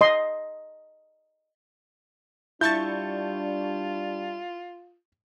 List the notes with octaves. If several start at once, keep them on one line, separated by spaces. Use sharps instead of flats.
D#5 C6
G3 D4 E4 F4 A5 C#6 G6 A6